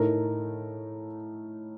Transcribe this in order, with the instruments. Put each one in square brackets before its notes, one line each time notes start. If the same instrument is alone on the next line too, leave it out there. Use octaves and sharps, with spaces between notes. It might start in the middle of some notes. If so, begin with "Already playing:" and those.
Already playing: [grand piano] A2 A3 D#4 A#4